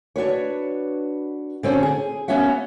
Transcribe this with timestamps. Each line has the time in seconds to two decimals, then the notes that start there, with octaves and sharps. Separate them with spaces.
0.16 D4 F#4 B4 C#5
1.63 D3 C4 C#4 F#4
1.83 G#4
2.28 A#3 B3 C#4 F#4 E5 F#5